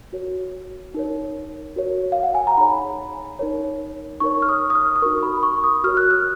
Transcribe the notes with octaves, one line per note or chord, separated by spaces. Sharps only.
F#4 A#4 C#5
D#4 A#4 C#5
F#4 A#4 C#5
F5
F#5
G#5
A#5
D#4 G#4 C#5 B5
D#4 A#4 C#5
D#4 A#4 C#5 C#6
F6
D#6
D#6
F6
D#6
D#4 F#4 A#4 C#6
B5
C#6
D#6
F#4 A#4 C#5 F6
F#6
F6